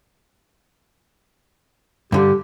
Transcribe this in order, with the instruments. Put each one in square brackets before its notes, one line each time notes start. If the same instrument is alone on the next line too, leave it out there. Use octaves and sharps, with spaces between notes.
[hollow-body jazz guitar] G2 D3 G3 [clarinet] G4